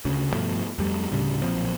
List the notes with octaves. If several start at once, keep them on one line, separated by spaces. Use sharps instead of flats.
D2 C#3
G2 B2 F3 A3
F2 G3 A3
D2 A2 C#3 G3
B1 A#2 F3 C4